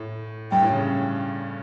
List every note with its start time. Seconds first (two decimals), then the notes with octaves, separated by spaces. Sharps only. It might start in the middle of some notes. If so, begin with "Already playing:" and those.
Already playing: A2
0.52 G2 G5
0.62 A2
0.72 C#3